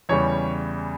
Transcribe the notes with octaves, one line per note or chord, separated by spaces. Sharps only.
E2 C#3 E3 G3 C#5